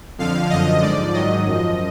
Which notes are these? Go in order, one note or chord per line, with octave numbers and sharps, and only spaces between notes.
F2 D3 F3 F5
F#2 D3 F3 D#5
G#2 F3 D5
G#2 D#3 F#3 D#5
F#2 F3